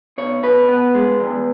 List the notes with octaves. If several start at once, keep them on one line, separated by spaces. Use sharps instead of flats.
B2 C#5
B2 B4
B3
G#3
E2